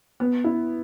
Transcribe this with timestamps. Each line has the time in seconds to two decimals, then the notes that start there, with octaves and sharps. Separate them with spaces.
0.20 B3
0.44 E4